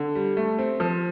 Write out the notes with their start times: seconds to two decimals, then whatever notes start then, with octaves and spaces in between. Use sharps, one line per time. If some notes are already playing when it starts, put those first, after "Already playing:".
Already playing: D3
0.15 G3
0.37 A3
0.59 C4
0.80 F3